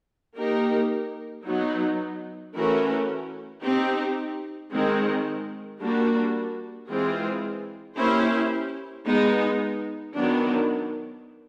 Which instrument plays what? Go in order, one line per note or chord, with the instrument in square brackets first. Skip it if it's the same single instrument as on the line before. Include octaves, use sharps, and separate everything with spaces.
[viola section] A#3 D#4 G4 A#4
F#3 B3 D#4
E3 A3 C#4 F#4 A#4
C4 D#4 G4
D#3 G#3 C4
G3 A#3 D4 F#4
E3 G#3 C4 F4 G#4
A#3 C#4 E4 G4 C5
G#3 B3 D#4
D#3 F#3 B3 D4